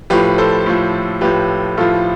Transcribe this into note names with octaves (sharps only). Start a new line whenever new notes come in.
A2 F3 G4 B4
A4 C5
A2 F3
A2 F3 G4 B4
A2 F3 F4 A4